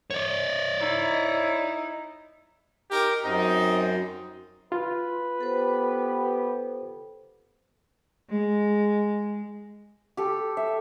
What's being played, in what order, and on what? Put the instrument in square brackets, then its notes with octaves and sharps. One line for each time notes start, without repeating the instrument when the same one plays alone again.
[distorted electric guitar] C#5 D5
[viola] D#4 E4
[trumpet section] D#4 G4 A#4
[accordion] F#2 [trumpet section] C4 D#4
[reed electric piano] F4 [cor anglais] B4
[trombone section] B3 G4 [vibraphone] A4 C5
[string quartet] G#3
[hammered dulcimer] G4 A4
E5